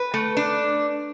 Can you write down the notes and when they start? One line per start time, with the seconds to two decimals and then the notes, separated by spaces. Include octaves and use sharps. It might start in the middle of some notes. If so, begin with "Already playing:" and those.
Already playing: B4
0.14 A3
0.37 D4